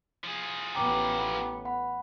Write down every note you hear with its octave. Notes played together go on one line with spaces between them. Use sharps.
F3 G#4
A1 B3 G5 A#5 D6
F#5 B5